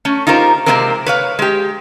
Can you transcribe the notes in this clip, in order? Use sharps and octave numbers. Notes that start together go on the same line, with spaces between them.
A3 C#4
D#4 F4 G4 A#4 C5
C3 F#3 G#3 A#3 C4 A#4
B4 C#5 F5
G#3 G4